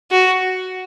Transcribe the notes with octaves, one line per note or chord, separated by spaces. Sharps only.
F#4